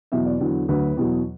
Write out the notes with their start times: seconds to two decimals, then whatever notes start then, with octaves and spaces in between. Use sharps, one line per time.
0.12 E2 B2 F#3 E5
0.26 D5
0.40 E2 D3 F#3
0.69 D2 D3 F#3 B4
0.97 E2 B2 F#3